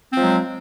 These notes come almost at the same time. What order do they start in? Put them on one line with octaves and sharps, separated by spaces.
C4 F3 G#3 F#3